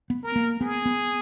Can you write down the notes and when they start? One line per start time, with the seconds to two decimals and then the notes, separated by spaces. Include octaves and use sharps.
0.10 B3
0.23 A#4
0.36 A#3
0.61 B3 G#4
0.86 B3